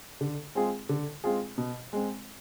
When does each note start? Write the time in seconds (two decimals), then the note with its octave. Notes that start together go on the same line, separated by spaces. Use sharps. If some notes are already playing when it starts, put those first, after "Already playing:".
0.21 D3
0.55 G#3 C4 F4 G#4
0.89 D3
1.24 G#3 C4 F4 G#4
1.58 B2
1.93 G#3 C4